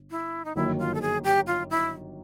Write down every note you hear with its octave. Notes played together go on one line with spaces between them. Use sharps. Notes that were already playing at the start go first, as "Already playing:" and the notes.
Already playing: G1
E4
D#4
G1 F#2 D#3 F#3 A#3 E4
F4
A4
G#4
G4
F4
E4